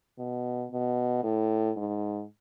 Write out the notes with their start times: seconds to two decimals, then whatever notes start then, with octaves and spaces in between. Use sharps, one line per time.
0.19 B2
0.72 B2
1.24 A2
1.77 G#2